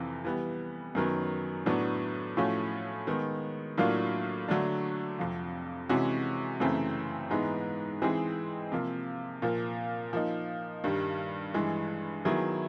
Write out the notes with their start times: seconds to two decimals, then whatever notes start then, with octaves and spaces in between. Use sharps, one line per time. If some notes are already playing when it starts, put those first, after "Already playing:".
Already playing: F2 C3 E3
0.25 E3 G3 B3
0.95 F#2 D#3 F#3 B3
1.66 A2 F#3 B3 D4
2.37 A2 F3 A3 C#4 F#4
3.07 D#3 G#3 B3
3.78 A2 F#3 A#3 D4 F4
4.48 D3 F#3 A3 D4
5.19 F2 C3 F3
5.89 C3 E3 G#3 C#4 F#4
6.60 F#2 C#3 E3 A3 C4
7.30 G#2 E3 G#3 B3
8.02 E3 G#3 C4 D#4 G#4
8.72 C3 F3 A#3
9.42 A#2 F3 A#3
10.13 F3 A#3 D#4
10.84 G2 D#3 G3
11.54 G2 E3 G#3
12.25 D#3 F#3 B3 E4 G#4